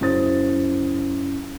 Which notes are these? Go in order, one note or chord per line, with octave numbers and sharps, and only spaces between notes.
F#2 C#3 E4 C5 D#6 A6